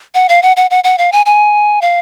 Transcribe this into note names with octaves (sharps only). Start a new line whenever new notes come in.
F#5
F5
F#5
F#5
F#5
F#5
F5
G#5
G#5
F5